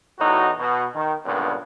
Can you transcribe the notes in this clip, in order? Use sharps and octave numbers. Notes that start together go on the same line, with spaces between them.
E2 A2 D#4 F#4
B2
D#3
C#2 G2 A#2 D3 D#3 B3